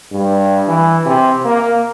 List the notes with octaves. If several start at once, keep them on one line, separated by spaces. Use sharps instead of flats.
G2
E3
C3
A#3